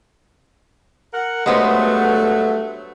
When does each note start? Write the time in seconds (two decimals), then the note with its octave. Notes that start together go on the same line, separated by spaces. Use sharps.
1.13 A#4 F#5
1.46 G2 F#3 G#3 A3 B3 C5